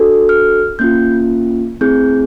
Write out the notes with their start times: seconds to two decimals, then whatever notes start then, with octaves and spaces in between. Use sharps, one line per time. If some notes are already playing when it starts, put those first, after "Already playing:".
Already playing: D4 F#4 A4
0.29 F6
0.79 A#3 C#4 F4 G6
1.81 A3 C4 E4 G#4 G6